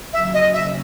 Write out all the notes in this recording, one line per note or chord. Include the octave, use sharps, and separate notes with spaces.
D#2 C#3 F#3 C#4 E5
D#5
E5